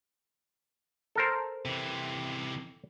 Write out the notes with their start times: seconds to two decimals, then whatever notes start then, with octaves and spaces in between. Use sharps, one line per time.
1.15 A4 A#4 C5
1.65 C3 E3